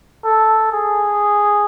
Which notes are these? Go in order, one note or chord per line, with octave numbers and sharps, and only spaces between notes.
A4
G#4